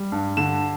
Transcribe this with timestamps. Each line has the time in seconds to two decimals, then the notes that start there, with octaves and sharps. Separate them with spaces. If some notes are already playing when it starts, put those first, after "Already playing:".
Already playing: G3
0.12 G2
0.37 D3 E7